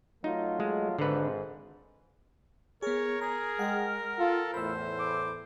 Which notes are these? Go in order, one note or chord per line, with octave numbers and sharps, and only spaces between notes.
F#3 A3 D#4 F4
G#3
G#1 G#2 D3 B4
B3 G#4 A#4 C#5
G#4 A#5
G#3 F#5 G5
F4 A4
E2 A2 C5 B5 E6
D6